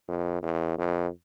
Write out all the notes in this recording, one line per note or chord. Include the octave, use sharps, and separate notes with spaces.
F2
E2
F2